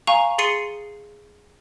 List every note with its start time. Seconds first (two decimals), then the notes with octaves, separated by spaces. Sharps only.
0.07 F5 G#5 A#5 C#6
0.38 G#4 C6 A6 C7 C#7 D#7